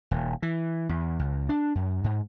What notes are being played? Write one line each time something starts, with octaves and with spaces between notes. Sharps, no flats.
D#1
E3
E2
C#2
D4
F#2
G#2